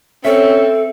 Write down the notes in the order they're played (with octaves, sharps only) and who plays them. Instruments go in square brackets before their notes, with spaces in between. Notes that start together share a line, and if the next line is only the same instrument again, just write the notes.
[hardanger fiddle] C4 [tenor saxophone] C#4 [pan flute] A4 [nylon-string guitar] E5